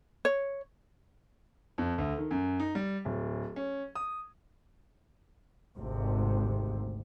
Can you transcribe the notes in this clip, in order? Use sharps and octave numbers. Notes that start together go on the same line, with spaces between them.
C#5
F2
D2
D#3
F#2
D#4
G3
D1
C#4
D#6
G#1 D2 G#2 C3